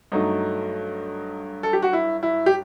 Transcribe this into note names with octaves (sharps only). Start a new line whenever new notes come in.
G2 F#3 A3 D#4
A4
G4
F#4
E4
E4
G4